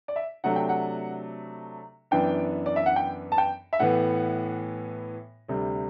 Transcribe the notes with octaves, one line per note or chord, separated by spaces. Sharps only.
D5
E5
C3 F#3 A3 D4 F#5
G5
F#5
F#2 E3 B3 D4 G5
D5
E5
F#5
G5
A5
G5
E5
A2 E3 B3 F#5
D2 C3 G3